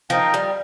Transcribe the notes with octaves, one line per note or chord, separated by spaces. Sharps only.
F3 D#4 A#4 D#5 G5
G3